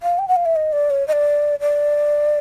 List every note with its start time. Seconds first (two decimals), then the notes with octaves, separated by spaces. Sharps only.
0.03 F5
0.19 G5
0.28 F#5
0.36 F5
0.45 E5
0.56 D#5
0.72 D5
0.90 C#5
1.08 D#5
1.13 D5
1.61 D5